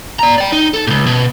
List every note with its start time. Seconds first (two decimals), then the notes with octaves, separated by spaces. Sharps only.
0.19 D5 A#5
0.38 D5 G5
0.53 D#4
0.74 A4
0.87 C#2 A#2
1.07 B2